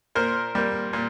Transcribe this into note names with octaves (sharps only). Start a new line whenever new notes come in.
A#2 A#4 C5
G3 A#3
A#2